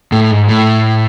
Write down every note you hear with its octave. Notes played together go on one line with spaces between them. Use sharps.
A2
G#2
A2